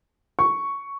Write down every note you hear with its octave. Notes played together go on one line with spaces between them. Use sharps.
C#6